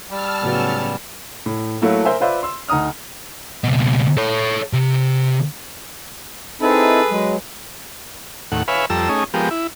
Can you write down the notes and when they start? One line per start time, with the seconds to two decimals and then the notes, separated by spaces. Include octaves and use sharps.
0.11 G3 A5 E6 F6
0.43 A2 C#3 F#3 B3 C#4
1.46 A2
1.82 F#3 A3 A#3 E4 A4
2.05 A#4 C5 E5 G#5
2.20 F4 B4 C5 D5 E5
2.43 C6 E6
2.68 D2 D#4 A#5 D#6 F6
3.64 C#2 B2
4.17 A4 C#5
4.73 C3
6.61 C4 D#4 E4 G#4 A4 B4
7.11 F#3 G#3
8.52 D#2 A2 F#5
8.68 B4 C#5 E5 F5 G#5 B5
8.90 F2 G3 A4 A#5 E6
9.09 A3 C#4 D#4 G#4
9.34 F3 G#3 B3 G4 A#4
9.51 E4